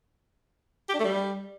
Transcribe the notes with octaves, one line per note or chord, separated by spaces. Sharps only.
G4
D4
A3
G3